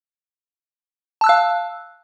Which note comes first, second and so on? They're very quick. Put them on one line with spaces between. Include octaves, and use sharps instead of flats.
A5 E6 F#6 F5